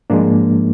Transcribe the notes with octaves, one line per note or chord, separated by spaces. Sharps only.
G#2 F3 G#3 A#3 D4